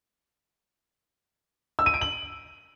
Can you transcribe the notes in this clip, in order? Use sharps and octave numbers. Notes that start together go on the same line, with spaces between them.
E6
D#7
D7
F#7